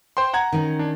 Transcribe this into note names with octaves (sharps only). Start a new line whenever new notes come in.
C5 G5 C6
F#5 A#5 G#6
D#3 C#4
D4